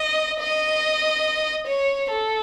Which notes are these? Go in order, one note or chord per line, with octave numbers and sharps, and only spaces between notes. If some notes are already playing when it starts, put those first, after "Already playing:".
Already playing: D#5
D#5
C#5
A4